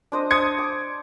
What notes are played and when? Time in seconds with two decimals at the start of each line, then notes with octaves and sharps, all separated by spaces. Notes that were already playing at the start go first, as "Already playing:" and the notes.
0.12 D4 C5 D#5
0.31 C5 D#6 G#6 C#7
0.58 D6